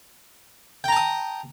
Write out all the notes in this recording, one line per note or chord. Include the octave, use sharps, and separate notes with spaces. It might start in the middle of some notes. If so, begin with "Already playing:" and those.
G5 A5 A#5 D#6